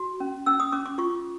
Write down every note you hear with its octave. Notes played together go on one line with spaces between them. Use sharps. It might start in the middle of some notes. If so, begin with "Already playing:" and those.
Already playing: F#4
C#4
C#4 E6
D#6
C#4 D6
D6
F4 C#6